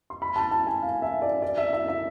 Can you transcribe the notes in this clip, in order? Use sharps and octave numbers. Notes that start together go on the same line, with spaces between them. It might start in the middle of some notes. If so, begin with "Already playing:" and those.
C6
B5
A5
A5
G#5
F5
E5
D5
D5
E5
E5
E5